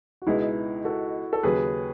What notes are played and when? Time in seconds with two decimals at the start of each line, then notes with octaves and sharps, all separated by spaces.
0.22 F#4
0.27 C#2 B2 G#3 B3 D#4 E4 G#4
0.85 F#4 A4
1.33 A4
1.43 D#2 C#3 F#3 G#4 B4